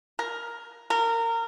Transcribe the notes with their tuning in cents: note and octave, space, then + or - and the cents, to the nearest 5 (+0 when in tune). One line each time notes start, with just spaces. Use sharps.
A#4 +5
A#4 -25